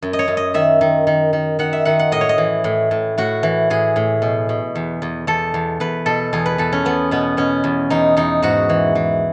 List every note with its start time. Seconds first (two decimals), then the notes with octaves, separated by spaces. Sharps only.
0.02 F#2
0.13 D#5
0.19 C#5
0.28 F#2
0.37 D#5
0.54 D#3 E5
0.81 D#3
1.07 D#3
1.33 D#3
1.59 D#3 F#5
1.73 E5
1.85 D#3 F#5
1.99 F#5
2.12 A2 D#5
2.21 C#5
2.29 D#5
2.38 E3
2.64 A2
2.91 A2
3.18 A2 F#4
3.43 E3
3.70 A2 G#4
3.96 A2
4.22 B2
4.49 B2
4.75 E2
5.02 E2
5.27 E2 A4
5.54 E2
5.80 E2 B4
6.06 B2 A4
6.33 E2 G#4
6.46 B4
6.58 E2 A4
6.72 C#4
6.85 E2 B3
7.11 B2 B3
7.37 B2 C#4
7.64 E2
7.90 E2 D#4
8.17 E2 D#4
8.42 G#2 F#4
8.69 E3
8.95 E3